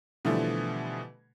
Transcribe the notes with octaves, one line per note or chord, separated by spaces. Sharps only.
B2 D3 E3 F3 G3 A3